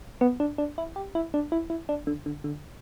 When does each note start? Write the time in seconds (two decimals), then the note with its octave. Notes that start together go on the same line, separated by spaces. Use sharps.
0.21 B3
0.40 D4
0.58 D4
0.78 E4
0.96 G4
1.15 E4
1.34 D4
1.52 E4
1.70 E4
1.89 D4
2.07 D3
2.26 D3
2.44 D3